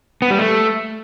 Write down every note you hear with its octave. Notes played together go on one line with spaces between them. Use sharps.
B3
G3
A3